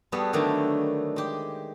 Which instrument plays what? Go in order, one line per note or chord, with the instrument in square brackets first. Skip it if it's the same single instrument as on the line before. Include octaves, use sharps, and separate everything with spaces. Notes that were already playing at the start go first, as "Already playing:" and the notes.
[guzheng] G3 B3 F#4 G#4 A4
D3 D#3 F#3 G3 A3
G#3 G4